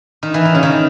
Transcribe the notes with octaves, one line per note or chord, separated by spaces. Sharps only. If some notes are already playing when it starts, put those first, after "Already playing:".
D#3
E3
D#3
C#3
D#3